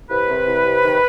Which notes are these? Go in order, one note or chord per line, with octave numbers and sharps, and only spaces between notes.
C2 B4
C3
C2
C3
D#3